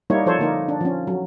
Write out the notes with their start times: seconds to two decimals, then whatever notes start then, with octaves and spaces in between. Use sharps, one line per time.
0.10 G3 A#3 D#4 E4 C#5
0.26 F3 A4 C5 C#5
0.39 D3 A#3 D#4
0.68 D4
0.81 F3 C#4
1.07 F#3